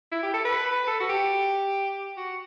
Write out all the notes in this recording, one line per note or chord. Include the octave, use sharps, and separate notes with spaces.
E4
G4
A4
B4
A4
F#4
G4
F#4